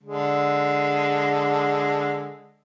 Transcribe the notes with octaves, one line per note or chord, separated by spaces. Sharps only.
D3 G#3